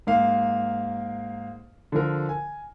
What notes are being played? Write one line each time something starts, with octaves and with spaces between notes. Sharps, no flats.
G#2 A#3 F5
D3 F3 A#4
G#5